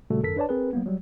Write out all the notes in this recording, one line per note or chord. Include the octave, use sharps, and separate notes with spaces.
A#2 C#3 G3 A3 F#4 A4
G#1 F#2 A4 A#4 B6
D4 B4 C#5 D5 A5
C4 G#4 A#4 B4
F#3 A#3 B3
F#3 G3